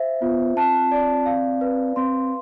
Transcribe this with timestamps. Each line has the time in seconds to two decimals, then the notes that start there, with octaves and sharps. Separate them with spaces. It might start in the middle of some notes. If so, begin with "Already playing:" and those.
Already playing: C5 E5 F5
0.22 B3 F4
0.57 C4 A5
0.92 D5
1.26 F5
1.61 B4
1.96 C4 C6